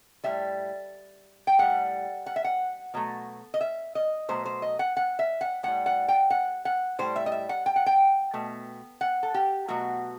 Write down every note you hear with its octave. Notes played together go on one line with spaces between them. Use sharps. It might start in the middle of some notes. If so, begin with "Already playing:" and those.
A2 G3 E5
G5
A2 G3 F#5
F#5
E5
F#5
B2 F#3 A3
D#5
E5
D#5
B2 F#3 A3 C5
C5
D#5
F#5
F#5
E5
F#5
A2 G3 F#5
F#5
G5
F#5
F#5
A2 G3 C5
E5
D#5
E5
F#5
G5
F#5
G5
B2 A3
F#5
A4
G4
B2 F#3 A3 F#4